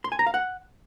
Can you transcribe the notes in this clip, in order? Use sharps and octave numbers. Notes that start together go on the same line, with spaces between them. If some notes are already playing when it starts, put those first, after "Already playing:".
C6
G#5
A#5
F5
F#5